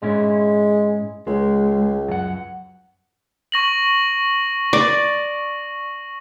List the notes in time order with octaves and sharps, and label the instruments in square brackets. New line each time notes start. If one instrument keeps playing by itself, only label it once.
[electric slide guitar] G#2 C#4 E4 [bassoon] G#3
[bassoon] C#2 [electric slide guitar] G#3
[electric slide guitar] F#2 F#5
[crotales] C#6 A#6 F#7
[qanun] D5